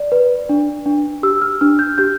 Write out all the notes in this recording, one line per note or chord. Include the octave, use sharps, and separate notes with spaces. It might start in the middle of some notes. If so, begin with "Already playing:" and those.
Already playing: D5
B4
D4
D4
G4 E6
F6
D4 F6
G6
G4 G6